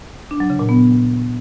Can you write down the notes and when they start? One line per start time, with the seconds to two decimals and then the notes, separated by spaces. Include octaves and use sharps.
0.31 D4
0.40 F#3
0.50 C#3
0.59 A#2
0.69 B3